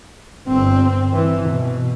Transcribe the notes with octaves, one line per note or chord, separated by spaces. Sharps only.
G1 C4
E3
B2